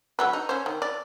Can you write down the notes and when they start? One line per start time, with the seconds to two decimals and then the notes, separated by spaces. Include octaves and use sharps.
0.19 D3 F#3 B4
0.33 D#4
0.49 C#4 C5
0.66 D#3
0.82 D5